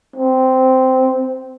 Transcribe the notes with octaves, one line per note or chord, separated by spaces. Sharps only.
C4